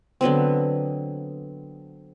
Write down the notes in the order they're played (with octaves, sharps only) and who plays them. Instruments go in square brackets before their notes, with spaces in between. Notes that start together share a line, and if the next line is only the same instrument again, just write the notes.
[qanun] D3 F#3 B3 C4